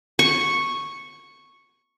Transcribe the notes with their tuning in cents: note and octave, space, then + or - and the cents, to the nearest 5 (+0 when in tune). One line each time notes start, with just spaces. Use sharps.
C#6 -5